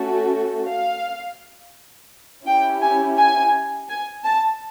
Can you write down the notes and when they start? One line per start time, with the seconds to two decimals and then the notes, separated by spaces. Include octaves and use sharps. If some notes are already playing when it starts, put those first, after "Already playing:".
Already playing: A3 C#4 F#4 A4
0.68 F5
2.46 C#4 E4 G4 G5
2.82 G#5
3.18 G#5
3.89 G#5
4.25 A5